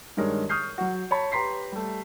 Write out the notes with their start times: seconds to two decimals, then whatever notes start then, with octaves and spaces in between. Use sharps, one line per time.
0.17 G2 D#3 G#3 A#4 C#5
0.49 C#6 D#6 F6 G6 C7
0.78 F#3 F#4
1.11 C#5 A5 B5
1.32 G4 B4 A#5 C6 B6 C7
1.72 G3 A3